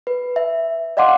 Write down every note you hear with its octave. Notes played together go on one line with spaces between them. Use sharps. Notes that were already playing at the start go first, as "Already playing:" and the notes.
B4
E5
D5 D#5 F5 F#5 C6 D6